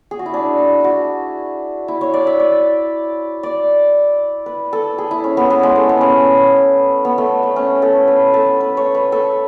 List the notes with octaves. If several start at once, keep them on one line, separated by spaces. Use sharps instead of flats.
G#4
F#4
E4
D4
E4
E4 F#4
E4
C#5
D5
E5
D5
D5
B4
A4
G#4
E4
C#4
B3
B3
G#3
A3
B3
C#4
B3
A3
A3
C#4
A4
B4
A4
B4
C#5
B4
A4